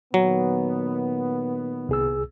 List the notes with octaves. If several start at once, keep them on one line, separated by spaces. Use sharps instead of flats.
A#2 D#3 F#3 B3
C2 G#4 E6